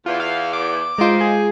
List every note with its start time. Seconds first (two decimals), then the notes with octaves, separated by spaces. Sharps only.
0.06 E2 F4
0.20 F5
0.53 D6
0.98 D#3 G#3 D#4 F4 C5
1.21 G#4